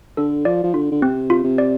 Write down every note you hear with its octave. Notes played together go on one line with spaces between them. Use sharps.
D3 A4
F3 D5
F3
D3 F4
D3
C3 C4
F4
C3
D5